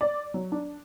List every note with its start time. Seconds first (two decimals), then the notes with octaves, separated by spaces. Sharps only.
0.01 D5
0.34 F#3
0.52 D4